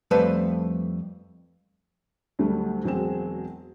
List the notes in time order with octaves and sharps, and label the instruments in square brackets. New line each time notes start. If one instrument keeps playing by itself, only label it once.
[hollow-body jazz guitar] F2 G3 A3 B4 C5 A5
[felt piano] D2 F#3 G3 A3
E1 F#3 G#3 C4 E7